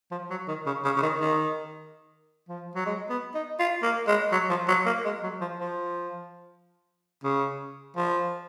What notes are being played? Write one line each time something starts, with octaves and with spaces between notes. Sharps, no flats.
F3
F#3
D#3
C#3
C#3
C#3
D#3
D#3
F3
F#3
G#3
B3
D#4
F4
A#3
G#3
F#3
F3
F#3
A#3
G#3
F#3
F3
F3
C#3
F3